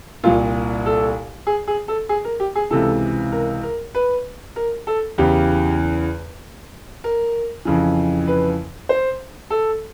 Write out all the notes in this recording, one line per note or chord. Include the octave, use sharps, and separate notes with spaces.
C2 A#2 F4
A4
G#4
G#4
A4
G#4
A#4
G4
G#4
C#2 C3 E3 A4
A#4
A#4
B4
A#4
A4
E2 C#3 E3 G4
A#4
F2 C#3 E3
B4
C5
A4